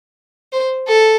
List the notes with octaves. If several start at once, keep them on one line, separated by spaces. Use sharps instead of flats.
C5
A4